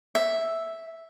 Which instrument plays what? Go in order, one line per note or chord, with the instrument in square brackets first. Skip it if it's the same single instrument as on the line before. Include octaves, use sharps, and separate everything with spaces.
[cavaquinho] E5